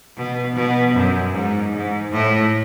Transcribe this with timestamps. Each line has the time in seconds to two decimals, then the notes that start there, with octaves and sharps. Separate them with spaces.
0.17 B2
0.55 B2
0.94 F#2
1.33 G#2
1.73 G#2
2.12 A2